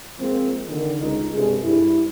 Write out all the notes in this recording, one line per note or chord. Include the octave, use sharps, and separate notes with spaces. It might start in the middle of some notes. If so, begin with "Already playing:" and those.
F3 G#3 A#3 C4
D3 D#3
C#2 D#4
G2 C3 G#3 G#4 A4
G2 E4